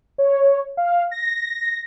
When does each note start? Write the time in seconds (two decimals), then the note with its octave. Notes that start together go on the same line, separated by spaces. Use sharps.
0.18 C#5
0.77 F5
1.11 A#6